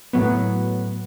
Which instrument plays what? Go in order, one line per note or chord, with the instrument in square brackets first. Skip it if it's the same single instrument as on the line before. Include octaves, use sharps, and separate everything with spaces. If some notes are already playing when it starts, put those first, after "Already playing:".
[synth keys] A2 F#3 B3